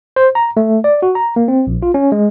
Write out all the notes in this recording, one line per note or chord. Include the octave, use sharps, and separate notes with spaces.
C5
A#5
A3
D5
F#4
A#5
A#3
C4
A#1
F4
C#4
G#3